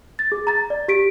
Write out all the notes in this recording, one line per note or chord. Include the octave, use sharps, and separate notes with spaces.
A6
G#4
A#5 A6
D5
G4 B6 D7